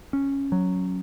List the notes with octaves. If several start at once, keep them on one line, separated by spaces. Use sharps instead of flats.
C#4
F#3